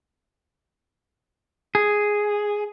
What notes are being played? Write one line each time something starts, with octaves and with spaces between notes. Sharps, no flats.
G#4